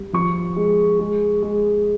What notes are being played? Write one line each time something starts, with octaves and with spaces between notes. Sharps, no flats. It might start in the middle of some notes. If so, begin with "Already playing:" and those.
Already playing: G3
F3 C#6
G#3
G#3
G#3